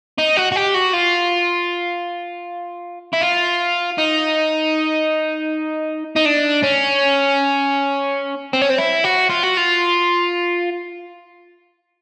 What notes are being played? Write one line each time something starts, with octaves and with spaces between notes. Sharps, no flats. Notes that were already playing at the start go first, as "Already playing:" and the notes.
D#4
F#4
F#4
G4
F#4
F4
E4
F4
D#4
D#4
D4
C#4
C4
C#4
C4
E4
F#4
F4
F#4
F4